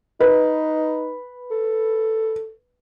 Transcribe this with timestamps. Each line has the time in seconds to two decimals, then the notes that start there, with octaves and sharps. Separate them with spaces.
0.20 D#4 B4
1.51 A4